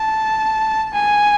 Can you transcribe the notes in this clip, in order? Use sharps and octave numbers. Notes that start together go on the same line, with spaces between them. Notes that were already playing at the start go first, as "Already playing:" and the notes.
Already playing: A5
G#5